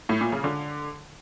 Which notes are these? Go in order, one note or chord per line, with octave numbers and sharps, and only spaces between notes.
A2
A#2
C#3
D3